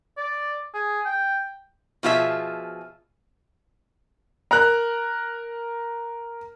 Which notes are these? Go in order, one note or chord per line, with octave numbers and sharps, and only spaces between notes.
D5
G#4
G5
B2 F3 F4 G#4 C5 E5
A#4 A#5 F#6